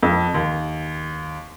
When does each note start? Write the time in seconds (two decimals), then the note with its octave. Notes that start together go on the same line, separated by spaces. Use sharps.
0.03 F2
0.34 D#2